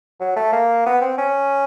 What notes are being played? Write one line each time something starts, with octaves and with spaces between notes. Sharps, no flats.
F#3
A3
A#3
B3
C4
C#4